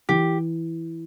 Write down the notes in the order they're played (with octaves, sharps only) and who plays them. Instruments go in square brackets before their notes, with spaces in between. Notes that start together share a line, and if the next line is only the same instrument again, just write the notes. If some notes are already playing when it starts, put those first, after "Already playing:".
[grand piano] E3 [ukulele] G4